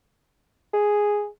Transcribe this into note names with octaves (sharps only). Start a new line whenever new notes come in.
G#4